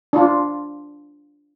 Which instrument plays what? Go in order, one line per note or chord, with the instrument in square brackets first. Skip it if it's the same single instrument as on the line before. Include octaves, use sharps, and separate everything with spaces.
[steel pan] D4 F4